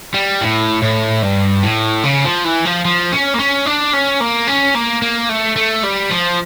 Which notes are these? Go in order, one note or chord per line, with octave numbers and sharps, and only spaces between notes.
G3
A2
A2
G2
A2
C#3
F3
E3
F3
F3
C#4
A#3
C#4
D4
C#4
A#3
C#4
A#3
A#3
A3
A3
G3
F3